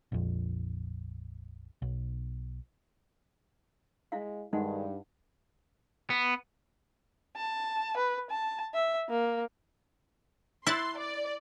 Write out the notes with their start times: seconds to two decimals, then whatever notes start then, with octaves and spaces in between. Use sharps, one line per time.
0.12 A#1 F2
1.82 B1
4.12 G#3 E4 F5
4.53 G2 D#3 G#3 D#4 F#5
6.10 B3
7.36 A5
7.97 B4
8.30 A5
8.74 E5
9.09 A#3
10.67 E4 C6 E6 F#6 A6
10.98 D5